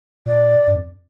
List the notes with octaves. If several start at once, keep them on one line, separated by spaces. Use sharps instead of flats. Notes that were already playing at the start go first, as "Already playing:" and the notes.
A#2 D5
G2
F2